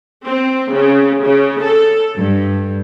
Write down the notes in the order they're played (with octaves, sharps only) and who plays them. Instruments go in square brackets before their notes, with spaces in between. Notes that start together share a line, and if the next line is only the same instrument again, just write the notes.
[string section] C4
C#3
C#3
A4
G2